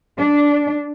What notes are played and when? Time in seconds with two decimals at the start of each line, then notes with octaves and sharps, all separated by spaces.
0.17 D4